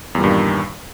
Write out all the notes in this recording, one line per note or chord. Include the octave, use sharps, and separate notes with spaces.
E2 G2 A#2 D#3 G3